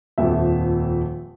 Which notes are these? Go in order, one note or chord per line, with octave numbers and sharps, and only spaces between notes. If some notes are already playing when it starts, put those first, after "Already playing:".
D#1 F2 F3 E5